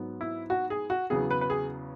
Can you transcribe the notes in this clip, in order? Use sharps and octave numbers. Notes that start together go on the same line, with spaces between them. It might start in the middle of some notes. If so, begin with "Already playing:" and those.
Already playing: G#2 F#3 B3
E4
F#4
G#4
F#4
E2 C#3 F#3 B3 G#4
B4
B4
G#4